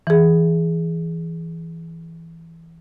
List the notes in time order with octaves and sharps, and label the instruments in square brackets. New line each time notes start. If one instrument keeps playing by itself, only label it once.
[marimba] E3 G#4